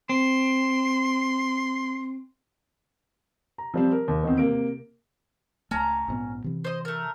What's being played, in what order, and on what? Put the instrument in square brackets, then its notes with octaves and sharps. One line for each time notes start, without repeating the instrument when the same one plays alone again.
[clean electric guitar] C4 [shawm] C6
[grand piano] A#5
F3 G3 C4
A#4
D#2
E2 D#3 B3 C4
C3 A#3 D7
[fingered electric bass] C#2 A3 [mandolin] C#4 A#5
[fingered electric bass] A#1 G#2 B3
C3 E3
[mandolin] C5 D#5
A3 A#4